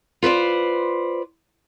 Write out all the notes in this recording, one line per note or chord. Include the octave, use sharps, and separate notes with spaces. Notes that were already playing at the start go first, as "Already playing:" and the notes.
F4 B4 C5 D5